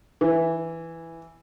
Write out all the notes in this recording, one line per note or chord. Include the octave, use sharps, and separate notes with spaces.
E3